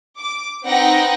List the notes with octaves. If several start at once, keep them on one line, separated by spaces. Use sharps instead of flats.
D6
C4 D#4 B4 F#5 G5 A#6